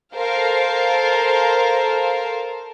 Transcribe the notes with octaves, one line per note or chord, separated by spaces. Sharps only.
A4 A#4 C5 F5